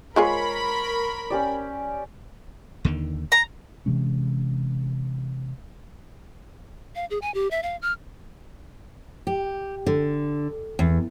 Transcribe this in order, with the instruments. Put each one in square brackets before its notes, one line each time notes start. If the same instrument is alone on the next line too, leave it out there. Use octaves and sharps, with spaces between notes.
[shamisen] G#3 F4 G#4 [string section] A#4 B5 [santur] C#5 C6
[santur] C#4 G4 D5
[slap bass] D#2 D3 D#3
[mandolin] A#5
[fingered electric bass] C3 E3 G#3 C#4
[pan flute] F5
G#4
G#5
G4
E5
F5
F6
[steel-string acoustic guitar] G4
D3
E2